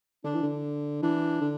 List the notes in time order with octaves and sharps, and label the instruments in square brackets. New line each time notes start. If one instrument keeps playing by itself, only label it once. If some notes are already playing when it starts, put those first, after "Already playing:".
[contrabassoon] D3 [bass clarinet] D4
[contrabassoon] E3
D3
[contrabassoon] E3 [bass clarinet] D4
[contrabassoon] D3